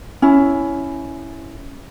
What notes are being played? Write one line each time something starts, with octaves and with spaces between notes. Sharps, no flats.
C#4 E4